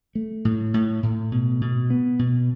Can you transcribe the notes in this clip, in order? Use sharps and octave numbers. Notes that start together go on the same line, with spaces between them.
A3
A2
A2
A2
B2
B2
B3
B2